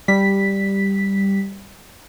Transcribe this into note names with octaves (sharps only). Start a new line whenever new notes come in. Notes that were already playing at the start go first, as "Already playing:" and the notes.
G3 B6